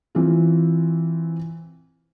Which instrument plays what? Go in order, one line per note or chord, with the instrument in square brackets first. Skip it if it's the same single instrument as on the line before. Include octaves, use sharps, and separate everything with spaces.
[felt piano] E3 C4 F4